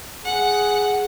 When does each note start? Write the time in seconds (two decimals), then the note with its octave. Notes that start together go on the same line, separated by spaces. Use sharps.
0.25 G#4 F#5